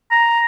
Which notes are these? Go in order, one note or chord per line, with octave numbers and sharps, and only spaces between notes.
A#5